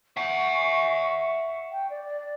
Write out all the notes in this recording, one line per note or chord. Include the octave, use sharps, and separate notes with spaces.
E5 F#5 C#6
G5
D5